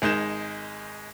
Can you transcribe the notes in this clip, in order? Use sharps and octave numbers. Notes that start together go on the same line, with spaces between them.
G#1 G#3 D#4 G6 E7